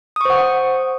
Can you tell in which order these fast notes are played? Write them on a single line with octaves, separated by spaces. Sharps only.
D#6 C#6 C5 F#5